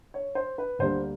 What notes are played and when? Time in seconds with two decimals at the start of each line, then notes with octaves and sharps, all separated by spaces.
0.14 C#5
0.35 C5
0.58 B4
0.79 D2 D3 G3 A#3 C5